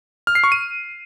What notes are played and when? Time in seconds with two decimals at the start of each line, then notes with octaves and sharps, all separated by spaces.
0.27 F6
0.35 C7
0.44 C#6
0.52 D#7